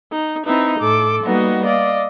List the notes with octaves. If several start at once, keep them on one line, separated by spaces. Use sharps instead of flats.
D#4
C4 D#4 E4 B4
A2 A4 D6
G3 A#3 B3 D#4 F#4 D#5
D5 D#5 F5